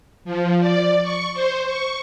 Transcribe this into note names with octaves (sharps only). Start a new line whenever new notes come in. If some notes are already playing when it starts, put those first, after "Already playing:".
F3
D5
C#6
C5
C#6